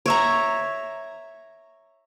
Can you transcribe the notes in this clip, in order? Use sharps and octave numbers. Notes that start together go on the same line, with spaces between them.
C#5 E5 A#5